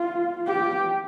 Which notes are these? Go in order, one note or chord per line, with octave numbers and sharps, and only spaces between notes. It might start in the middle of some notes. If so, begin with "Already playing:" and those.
Already playing: F4
G4